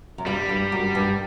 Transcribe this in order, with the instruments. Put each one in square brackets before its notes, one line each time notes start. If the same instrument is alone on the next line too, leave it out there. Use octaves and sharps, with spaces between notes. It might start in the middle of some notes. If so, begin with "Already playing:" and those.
[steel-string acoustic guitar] F#2
[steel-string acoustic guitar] G2 [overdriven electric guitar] G3
[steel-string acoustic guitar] G2
F#2
G2